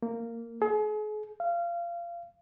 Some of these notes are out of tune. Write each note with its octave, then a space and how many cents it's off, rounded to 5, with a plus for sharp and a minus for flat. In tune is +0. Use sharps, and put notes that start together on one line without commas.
A#3 -10
G#4 +40
F5 -25